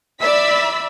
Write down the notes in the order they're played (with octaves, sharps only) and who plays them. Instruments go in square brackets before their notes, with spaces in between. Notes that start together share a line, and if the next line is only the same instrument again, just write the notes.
[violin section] D5 E6 B6 [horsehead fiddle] E5 B5